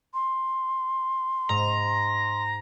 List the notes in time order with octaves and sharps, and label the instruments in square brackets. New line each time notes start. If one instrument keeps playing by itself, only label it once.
[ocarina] C6
[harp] G#2 [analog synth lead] A#5